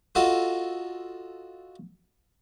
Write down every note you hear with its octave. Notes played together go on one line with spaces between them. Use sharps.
F4 F#4 A4 D#5